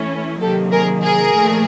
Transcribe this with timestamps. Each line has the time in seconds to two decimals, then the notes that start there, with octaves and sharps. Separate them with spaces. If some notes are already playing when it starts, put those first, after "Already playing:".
Already playing: E3 A3 C#4 E4
0.41 C3 D#3 F#3 A#3 G4 A4
0.72 G#4 A#4
1.03 G#4 A#4
1.34 A#2 F3 A3